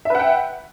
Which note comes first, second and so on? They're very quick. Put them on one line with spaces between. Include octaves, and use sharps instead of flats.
E5 B4 F#5 G5